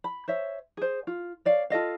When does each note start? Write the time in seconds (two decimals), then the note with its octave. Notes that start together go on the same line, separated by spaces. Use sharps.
0.04 B5
0.28 C5 C#5 E5
0.77 G#4 C5
1.07 F4
1.45 C#5 D5 F5
1.70 F4 A4 D#5 F5